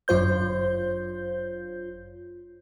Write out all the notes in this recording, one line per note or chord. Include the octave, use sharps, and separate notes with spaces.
G1 F#2 F4 C5 G6